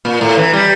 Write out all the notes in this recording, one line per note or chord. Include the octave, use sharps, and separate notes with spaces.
A#2
A2
E3
G3